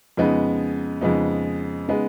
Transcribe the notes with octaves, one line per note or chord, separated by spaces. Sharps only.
F2 C#3 G#3 B3 D#4
F2 C#3 G#3 B3 D#4
C#3 G#3 B3 D#4